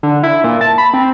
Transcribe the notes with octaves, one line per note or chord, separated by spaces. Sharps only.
D3
E4
A#2
A5
B5
C4